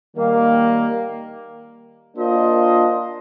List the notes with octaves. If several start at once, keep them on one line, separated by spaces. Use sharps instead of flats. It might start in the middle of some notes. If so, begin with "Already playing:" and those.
D#3 G3 A#3
A#3 D4 F4 C5 D#5